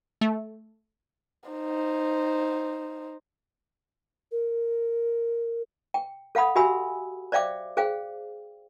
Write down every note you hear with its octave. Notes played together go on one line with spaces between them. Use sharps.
A3
D#4 C5
A#4
G5
A4 F5 F#5 B5 D#6
F#4 G4 E5 G#5 B5 E6
C5 D5 E5 F5 G5 D6
G#4 C5 F5 G5